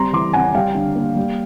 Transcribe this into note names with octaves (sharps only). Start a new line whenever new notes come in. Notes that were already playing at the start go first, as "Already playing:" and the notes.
Already playing: G3 C4 A#5 C6
E3 C6 D6
C4 F#5 G#5
G3 F5 G5
D3
A#3
G3